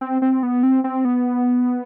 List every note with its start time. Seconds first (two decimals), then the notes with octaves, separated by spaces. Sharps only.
0.01 C4
0.22 C4
0.43 B3
0.63 C4
0.84 C4
1.05 B3